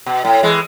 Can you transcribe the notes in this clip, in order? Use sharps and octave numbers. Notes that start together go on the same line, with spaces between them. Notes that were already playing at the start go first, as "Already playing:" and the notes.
B2
A2
E3 G#3